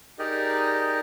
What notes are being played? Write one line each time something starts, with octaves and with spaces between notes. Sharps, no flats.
D#4 G4 G#4 A#4 D5 D#5